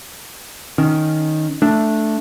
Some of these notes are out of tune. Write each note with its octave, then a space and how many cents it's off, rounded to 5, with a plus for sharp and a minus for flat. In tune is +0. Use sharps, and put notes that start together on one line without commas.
D#3 +0 C#4 +0
A3 +0 D4 +0